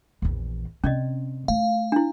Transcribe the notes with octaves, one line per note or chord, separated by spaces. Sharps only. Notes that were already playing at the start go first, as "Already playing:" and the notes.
A#1 E2
C3 C#4 D5 D#5
A3 F5
D4 E4